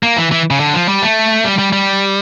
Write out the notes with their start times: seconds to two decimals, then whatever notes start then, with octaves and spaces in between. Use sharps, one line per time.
0.03 A#3
0.17 E3
0.32 E3
0.51 C#3
0.60 D3
0.74 F3
0.88 G3
1.02 A3
1.44 G3
1.58 G3
1.73 G3